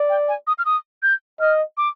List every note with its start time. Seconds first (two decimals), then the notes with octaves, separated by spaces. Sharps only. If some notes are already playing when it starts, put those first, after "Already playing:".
Already playing: D5
0.10 G5
0.28 G#5
0.47 D#6
0.59 F6
0.65 D#6
1.03 G6
1.40 D#5 F6
1.77 D6